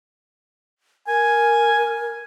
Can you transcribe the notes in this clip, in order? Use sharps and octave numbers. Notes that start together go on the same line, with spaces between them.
A#4 G#5